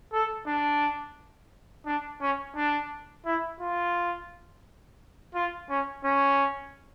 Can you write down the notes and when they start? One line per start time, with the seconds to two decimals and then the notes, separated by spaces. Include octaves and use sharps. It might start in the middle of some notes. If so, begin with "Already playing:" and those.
0.13 A4
0.47 D4
1.86 D4
2.21 C#4
2.57 D4
3.26 E4
3.60 F4
5.35 F4
5.69 C#4
6.04 C#4